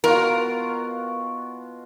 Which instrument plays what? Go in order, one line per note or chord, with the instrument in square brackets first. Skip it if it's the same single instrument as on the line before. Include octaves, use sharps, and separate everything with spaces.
[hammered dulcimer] B2 F4 F#4 [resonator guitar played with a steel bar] A#4